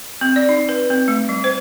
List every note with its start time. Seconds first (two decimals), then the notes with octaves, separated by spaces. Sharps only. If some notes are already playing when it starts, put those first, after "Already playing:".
0.21 C4
0.36 D5
0.49 D#4
0.69 B4
0.90 C4
1.08 A3
1.29 G3
1.44 C5